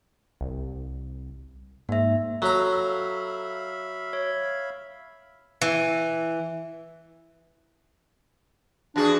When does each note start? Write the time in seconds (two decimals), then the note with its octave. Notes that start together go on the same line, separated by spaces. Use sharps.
0.41 C2
1.89 G#2 A#3 E5
2.42 F#3 A4 E5 F5 A#5 B5
4.13 C#5
5.62 E3
8.96 E2 D4 F#4 G#4